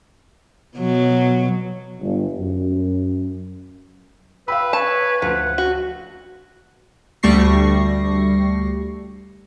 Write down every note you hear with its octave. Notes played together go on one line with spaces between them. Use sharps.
B2 F#3
G1
F#2
B4 F5 G5 B5 E6
C#5 A5
D2 F3 F#5
F#4
D2 G3 A3 C#6 A#6 C7